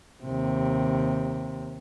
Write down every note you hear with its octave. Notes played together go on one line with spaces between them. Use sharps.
D#2 C3